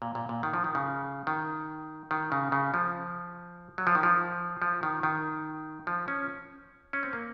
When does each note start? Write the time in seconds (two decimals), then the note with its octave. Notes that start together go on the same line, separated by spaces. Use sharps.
0.02 A#2
0.15 A#2
0.29 A#2
0.43 D#3
0.54 F3
0.64 D#3
0.75 C#3
1.27 D#3
2.11 D#3
2.32 C#3
2.52 C#3
2.74 F3
3.78 F#3
3.87 F3
3.95 D#3
4.03 F3
4.62 F3
4.83 D#3
5.03 D#3
5.87 F3
6.08 C#4
6.93 C#4
7.03 C4
7.13 A#3